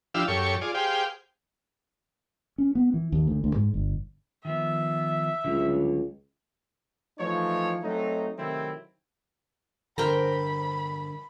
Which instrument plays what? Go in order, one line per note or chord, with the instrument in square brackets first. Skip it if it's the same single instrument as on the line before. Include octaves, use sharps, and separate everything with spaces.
[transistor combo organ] F3 D4 E4 G4 F5 E6
F#2 G4 A4 C#5 C#6
F4 G#4 D5
G4 G#4 C5 F5 G5
[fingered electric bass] C#4
B3
E3
D#2
D2
D2
G#2
G1
[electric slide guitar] D#3 F3 B3 [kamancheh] E5
[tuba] C#2 [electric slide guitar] D3 F#3 G3
[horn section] E3 F3 A3 D#4 C#5
F#3 A3 C4 D#4
C3 D#3 F#3 A3 C4 E4
[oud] E2 G2 C5 [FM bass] D3 [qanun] A#4 G5 A#5 [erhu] B5